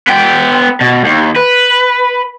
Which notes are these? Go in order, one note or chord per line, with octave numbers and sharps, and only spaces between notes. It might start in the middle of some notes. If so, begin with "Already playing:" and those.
B3 G5
B2
D#2
B4